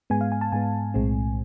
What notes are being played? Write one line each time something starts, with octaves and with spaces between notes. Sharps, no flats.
G#2 G#3 B3 G#5
F5
G#5
A5
G#2 G#3 B3 G#5
B1 A2 G#3 C4